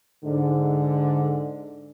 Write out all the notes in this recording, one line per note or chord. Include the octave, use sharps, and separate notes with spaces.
G#2 D3